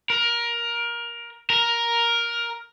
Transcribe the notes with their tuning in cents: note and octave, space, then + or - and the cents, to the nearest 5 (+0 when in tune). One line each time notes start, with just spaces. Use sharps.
A#4 +20
A#4 +10